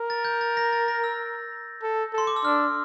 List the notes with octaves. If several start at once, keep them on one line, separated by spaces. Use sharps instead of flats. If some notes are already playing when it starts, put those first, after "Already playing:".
Already playing: A#4
A6
G6
A6
A#6
A6
A#6
E6
A4
A4 C6
D6
E6
D4 F6